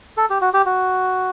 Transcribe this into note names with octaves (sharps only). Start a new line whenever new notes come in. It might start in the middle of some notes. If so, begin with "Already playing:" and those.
A4
G4
F#4
G4
F#4